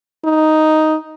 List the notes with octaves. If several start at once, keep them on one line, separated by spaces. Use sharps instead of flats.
D#4